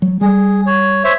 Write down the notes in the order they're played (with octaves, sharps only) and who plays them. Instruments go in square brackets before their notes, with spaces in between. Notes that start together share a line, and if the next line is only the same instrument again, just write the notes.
[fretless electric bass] F#3
[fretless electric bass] G3 [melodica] G#4
[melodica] C#5
C5 C#5 E5